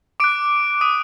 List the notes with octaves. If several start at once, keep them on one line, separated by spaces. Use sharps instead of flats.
D6 F#6 D7
D#6 D#7